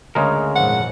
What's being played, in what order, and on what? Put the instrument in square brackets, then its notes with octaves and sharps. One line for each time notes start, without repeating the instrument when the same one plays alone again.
[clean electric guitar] D2 [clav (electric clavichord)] C#3 G#3 A#4
[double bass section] G#1 F2 A#2 [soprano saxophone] F#5